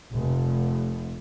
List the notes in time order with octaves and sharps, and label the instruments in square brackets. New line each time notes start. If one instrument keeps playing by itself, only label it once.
[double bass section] F1